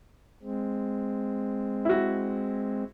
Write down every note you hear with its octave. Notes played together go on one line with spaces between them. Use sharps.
G#3 C4
E4 F#4